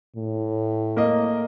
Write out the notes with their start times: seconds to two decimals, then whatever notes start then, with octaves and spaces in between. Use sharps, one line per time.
0.16 A2
0.97 A#3 D#5